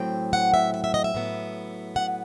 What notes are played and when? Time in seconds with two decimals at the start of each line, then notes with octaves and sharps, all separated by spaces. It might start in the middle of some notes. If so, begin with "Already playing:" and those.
Already playing: A2 F#3 C4 G5
0.33 F#5
0.54 E5
0.74 E5
0.84 E5
0.94 D#5
1.04 E5
1.15 A2 F#3 B3
1.96 F#5